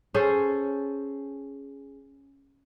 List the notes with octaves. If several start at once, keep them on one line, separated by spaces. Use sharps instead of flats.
C#4 G#4 A4 C5